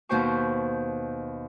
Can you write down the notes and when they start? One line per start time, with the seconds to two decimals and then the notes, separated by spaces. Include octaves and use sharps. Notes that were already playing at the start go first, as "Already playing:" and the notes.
0.09 D#2 B2 B3 C5 G5 C#6